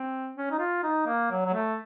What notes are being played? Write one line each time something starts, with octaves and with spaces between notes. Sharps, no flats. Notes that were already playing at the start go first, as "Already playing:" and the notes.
Already playing: C4
C#4
D#4
F4
D#4
A#3
F#3
F#3
A3